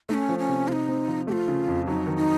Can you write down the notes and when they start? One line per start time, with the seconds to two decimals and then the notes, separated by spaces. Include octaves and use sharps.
0.09 A3 D#4
0.14 C#4
0.29 F3
0.39 C#4
0.49 C3
0.68 C3 D#4 F4
0.89 C4
1.08 F3
1.27 A3 G4
1.32 F4
1.48 C#3
1.68 F2
1.87 F#3 D#4
2.07 D#3
2.17 D#4